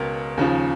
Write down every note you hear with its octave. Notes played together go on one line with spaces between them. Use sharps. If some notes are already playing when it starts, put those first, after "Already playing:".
Already playing: C#2 B2 A#4
D#2 C#3 F3